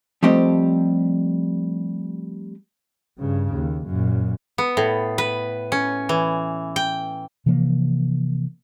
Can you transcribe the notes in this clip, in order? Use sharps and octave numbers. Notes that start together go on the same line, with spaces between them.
F3 G3 A3 C4 G4 D#5
G2 C#3
D#2
F#2 A#2
B3
A2
B4
C#4
E3
G5
C3 E3 F3 A#3